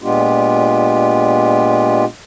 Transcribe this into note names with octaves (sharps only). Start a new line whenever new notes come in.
A#2 G#3 B3 D4 F4 G4